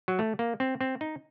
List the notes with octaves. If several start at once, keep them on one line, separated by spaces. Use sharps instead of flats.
F#3
A3
A#3
C4
C4
D#4